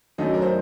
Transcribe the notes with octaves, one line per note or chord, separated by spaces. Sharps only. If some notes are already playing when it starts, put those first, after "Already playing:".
F#2 D#3 F#3 A3 D#5
D5
A#4
C5